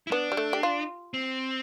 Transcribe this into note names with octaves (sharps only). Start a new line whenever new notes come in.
E4
B3 D4
G3
A3
G4
F4
C4